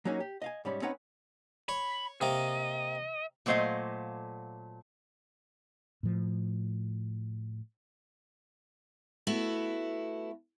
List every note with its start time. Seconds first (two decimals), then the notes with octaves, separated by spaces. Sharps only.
0.05 F#3 A#3 C#4 D#4 F#4 G#4
0.20 G4
0.42 D#5 F5 G#5
0.65 G#2 G3 C#4 B5
0.82 C4 C#4 D#4 B4 F#5 A#5
1.69 C#5 B5
2.21 C3 A#3 D#5
3.46 A#2 F#3 A3 C5 D#5 F5
6.03 A2 F3
9.27 A3 B3 E4 F#4